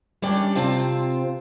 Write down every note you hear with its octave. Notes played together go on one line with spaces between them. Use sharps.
G3 C#4 D4 G4 D5
C3 C4 F4 C5 A5